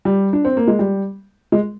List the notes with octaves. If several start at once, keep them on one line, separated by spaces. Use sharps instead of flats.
G3
D4
C4
A#3
G#3
G3
G#3